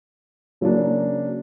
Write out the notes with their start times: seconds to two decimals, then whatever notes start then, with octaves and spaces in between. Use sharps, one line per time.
0.61 C#3 F#3 A#3 D4